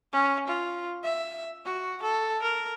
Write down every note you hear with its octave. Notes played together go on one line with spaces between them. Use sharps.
C#4
F4
E5
F#4
A4
A#4